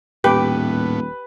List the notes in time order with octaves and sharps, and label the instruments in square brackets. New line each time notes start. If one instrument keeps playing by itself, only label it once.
[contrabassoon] D#1 [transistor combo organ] A2 B3 [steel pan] G4 [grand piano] B4